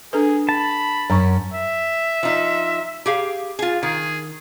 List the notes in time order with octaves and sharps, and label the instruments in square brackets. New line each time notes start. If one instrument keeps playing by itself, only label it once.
[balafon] D4 A4 B4 [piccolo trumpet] G#4
[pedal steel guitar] A5 [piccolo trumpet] B5
[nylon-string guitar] F#2 [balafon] A#5 C#6
[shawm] E5
[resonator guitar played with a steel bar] F3 D#4
G4 G#4 F5
F4 G#4
[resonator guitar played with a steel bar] D#3 [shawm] G#4